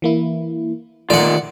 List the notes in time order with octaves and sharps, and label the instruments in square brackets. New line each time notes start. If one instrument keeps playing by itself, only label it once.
[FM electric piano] E3 A#3 E4
[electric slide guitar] D#3 F4 [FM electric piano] A3 [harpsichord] D5 F#5